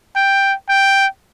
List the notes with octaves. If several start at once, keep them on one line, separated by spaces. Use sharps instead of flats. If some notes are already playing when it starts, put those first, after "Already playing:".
G5
G5